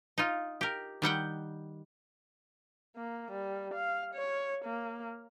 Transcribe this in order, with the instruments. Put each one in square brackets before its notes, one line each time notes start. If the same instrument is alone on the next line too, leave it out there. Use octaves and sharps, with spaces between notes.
[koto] D#4 F4
G4 A#4
D#3 G3 F#5 G5
[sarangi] A#3
G3
F5
C#5
A#3